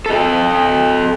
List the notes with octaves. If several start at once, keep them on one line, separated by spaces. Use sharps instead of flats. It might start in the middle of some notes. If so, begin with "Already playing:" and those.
A4 D#5